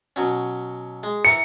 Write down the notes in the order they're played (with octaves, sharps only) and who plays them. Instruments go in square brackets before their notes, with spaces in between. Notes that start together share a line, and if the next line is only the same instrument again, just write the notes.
[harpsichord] B2 F#3 C#4
G#3
[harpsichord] E3 A#4 [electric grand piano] C#7